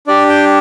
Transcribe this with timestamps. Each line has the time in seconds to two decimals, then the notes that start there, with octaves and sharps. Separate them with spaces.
0.07 D4 G4 D5
0.29 G5